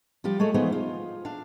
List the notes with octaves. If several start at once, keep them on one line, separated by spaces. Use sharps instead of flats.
F3 G3 F4 G4
G#3 A3 G#4 C#5
E3 F3 B3 D#4 G#4 C5
F4
D4 F5